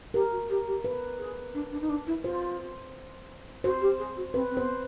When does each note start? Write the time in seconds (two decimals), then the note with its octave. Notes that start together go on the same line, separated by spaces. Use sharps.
0.14 G4 A#4
0.32 F#4
0.49 G4
0.67 G4
0.84 B4
1.19 G#4
1.54 D4
1.72 D4
1.81 D#4
1.89 D4
2.07 E4
2.24 F4 C5
3.64 F#4 C5
3.81 G4
3.99 G#4
4.17 F#4
4.34 C4 B4
4.50 C4
4.57 B3 C5